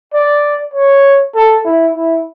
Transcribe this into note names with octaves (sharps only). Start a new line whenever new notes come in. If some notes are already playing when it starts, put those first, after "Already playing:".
D5
C#5
A4
E4
E4